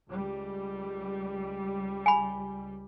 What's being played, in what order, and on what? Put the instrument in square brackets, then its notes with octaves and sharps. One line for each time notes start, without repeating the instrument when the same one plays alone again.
[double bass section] C#2 G3
[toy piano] G#5 B5